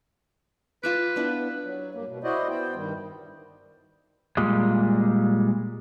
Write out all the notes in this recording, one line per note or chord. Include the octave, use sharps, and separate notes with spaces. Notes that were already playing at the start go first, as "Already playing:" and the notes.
F4 B4 A5 D6
B3 D4 E4
F#3
G2 A#3
B2
E4 F#4 C5 D5 D#5
B3 C5 G5
G2 D#3 G3
A#2 G3 G#3